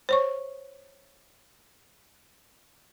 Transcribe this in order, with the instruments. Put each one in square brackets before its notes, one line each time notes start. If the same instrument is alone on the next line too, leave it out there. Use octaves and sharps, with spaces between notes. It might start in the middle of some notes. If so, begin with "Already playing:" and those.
[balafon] C5 C#5 C#6